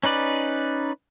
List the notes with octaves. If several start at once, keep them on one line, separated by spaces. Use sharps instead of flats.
C#4 D#4 B4 D5